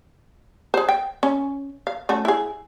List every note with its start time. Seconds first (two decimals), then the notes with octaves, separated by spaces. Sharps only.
0.74 G#4 C5
0.89 G5
1.23 C#4
1.87 F5
2.09 A3 C#4 F#4
2.25 E4 G#4